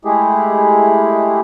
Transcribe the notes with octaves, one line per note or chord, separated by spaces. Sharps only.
G#3 A3 E4 G4 G#4